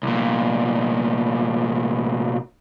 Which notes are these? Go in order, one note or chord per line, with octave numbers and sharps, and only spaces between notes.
C2 A#2